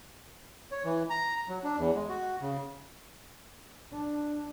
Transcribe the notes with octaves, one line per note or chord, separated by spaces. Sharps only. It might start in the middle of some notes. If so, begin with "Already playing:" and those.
C#5
E3
A#5
F#3
D4
E2
G#3
F#4
C#3
D4